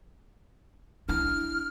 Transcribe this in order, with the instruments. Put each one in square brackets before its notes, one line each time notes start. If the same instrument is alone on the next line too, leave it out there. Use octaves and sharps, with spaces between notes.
[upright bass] D4 E4 [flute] F6